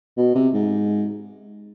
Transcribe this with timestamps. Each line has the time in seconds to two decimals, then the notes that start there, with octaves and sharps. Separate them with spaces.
0.17 B2
0.35 C3
0.54 G#2